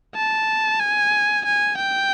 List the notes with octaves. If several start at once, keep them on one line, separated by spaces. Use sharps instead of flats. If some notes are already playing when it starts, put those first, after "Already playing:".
A5
G#5
G#5
G5